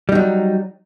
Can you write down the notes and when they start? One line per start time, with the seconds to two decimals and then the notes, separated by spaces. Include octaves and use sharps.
0.09 G3
0.12 D#4
0.15 F#3